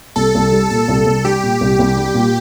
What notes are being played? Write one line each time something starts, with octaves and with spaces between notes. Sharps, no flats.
C2 A4
C2
G3
A#2 A4
C2
C2
G3 G4
A#2
C2
C2
G3
A#2